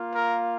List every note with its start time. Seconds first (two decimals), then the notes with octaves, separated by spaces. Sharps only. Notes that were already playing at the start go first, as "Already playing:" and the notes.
Already playing: A#3 F4
0.13 A#4